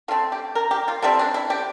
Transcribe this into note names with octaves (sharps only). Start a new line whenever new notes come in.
D3 A3 C4 F4
G4
A#4
G4
F4
D3 G3 C4 E4
D4
E4
G4